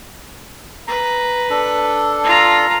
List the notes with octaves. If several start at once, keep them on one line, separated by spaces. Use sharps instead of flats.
B4 A#5
D4 A4
F4 A#5